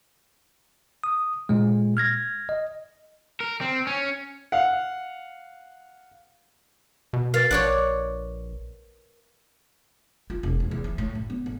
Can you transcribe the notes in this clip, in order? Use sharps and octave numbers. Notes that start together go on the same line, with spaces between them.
D#6
A#2 G#3
F6 G#6 A#6
D#5
A#4
C4
C#4
F5 F#5
B2
A#4 B4 F5 A6
A#1 C#5 D5 F#5
F4
E1
E1
E2
E3
A2
F#1
B3
A1